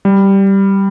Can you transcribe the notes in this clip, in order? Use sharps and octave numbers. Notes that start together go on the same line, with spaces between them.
G3